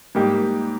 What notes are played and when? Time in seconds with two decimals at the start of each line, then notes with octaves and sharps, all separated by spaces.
0.15 G#2 G3 A#3 D#4 G4